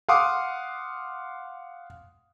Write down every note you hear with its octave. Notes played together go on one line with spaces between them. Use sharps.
F5 F#5 C6 D6 D#6